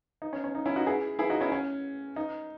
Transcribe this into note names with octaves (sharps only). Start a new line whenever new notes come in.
D#4
C#4
C#4
D#4
C#4 E4
D#4 F#4
E4 G#4
E4 G#4
D#4 F#4
C#4 E4
C#4
D#4